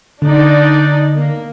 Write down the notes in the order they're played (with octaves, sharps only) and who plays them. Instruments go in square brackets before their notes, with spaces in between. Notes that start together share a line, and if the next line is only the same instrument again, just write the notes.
[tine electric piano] D3 [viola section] D4 D#4 D5
[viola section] A#3